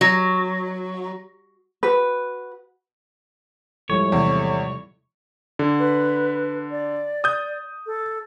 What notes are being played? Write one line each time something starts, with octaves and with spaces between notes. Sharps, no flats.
F#3
F#4 B4
A2 F3 G3 G#3 C#5
E2 C3 E4
D3
B4
D5
D#6 G6
A4